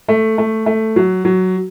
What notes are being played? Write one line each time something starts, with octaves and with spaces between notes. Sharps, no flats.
A3
A3
A3
F#3
F#3